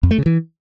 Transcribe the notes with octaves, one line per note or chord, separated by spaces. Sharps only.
F2
A3
C#3
E3